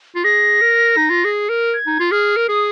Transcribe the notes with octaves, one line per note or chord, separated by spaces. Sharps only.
F4
G#4 A#6
A#4
D#4
F4
G#4
A#4
G#6
D#4
F4
G#4 F6
A#4
G#4 D#6